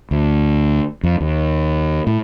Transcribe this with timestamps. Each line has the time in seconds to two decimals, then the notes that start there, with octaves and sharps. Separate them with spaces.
0.11 D2
1.03 F2
1.20 D#2
2.07 A2